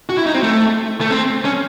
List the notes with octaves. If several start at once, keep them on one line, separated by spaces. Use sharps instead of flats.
F#4
E4
D#4
C4
A3
A3
C4
C#4